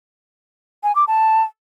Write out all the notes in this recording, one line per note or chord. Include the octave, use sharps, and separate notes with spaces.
G#5
D6
A5